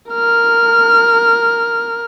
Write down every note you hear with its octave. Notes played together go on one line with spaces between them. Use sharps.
A#4 F6